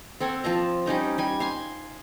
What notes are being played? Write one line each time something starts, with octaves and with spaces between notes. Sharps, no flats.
C4 A4 C#5 F#5
F3 F4 A5 A#5
G3 C#4 D#4 A#4
G3 G#5
F5 G#5 C6